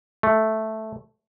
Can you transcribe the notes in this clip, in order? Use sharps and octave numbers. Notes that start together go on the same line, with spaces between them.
A3